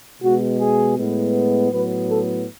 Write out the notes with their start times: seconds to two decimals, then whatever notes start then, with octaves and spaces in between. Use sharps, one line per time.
0.23 B2 G#3 B3 F#4
0.60 G#4
0.97 A2 G#3 B3
1.71 A2 F#3 B3 B4
2.08 A4